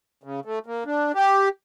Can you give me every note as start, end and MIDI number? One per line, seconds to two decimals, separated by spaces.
0.24 0.40 49
0.45 0.59 57
0.66 0.84 58
0.86 1.12 62
1.15 1.49 67